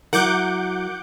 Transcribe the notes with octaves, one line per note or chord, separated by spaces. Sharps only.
F#3 E4 A#4 F#5 D6 G6